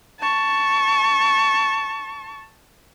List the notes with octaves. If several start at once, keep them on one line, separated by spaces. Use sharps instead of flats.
A5 C#6